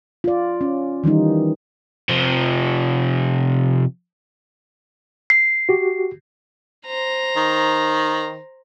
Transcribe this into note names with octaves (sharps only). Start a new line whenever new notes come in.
F4 D5
C#4
D#3 E3 G3 D#4
C3 F3
C7
F#4 G4
C5 A#5
D#3